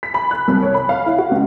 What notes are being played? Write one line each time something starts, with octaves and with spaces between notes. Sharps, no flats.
B6
B5
F#6
C2
C#5
B5
F5
E4
F#4
C#2